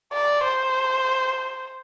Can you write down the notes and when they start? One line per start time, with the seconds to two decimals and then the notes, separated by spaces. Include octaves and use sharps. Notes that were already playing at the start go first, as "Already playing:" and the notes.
0.13 D5
0.44 C5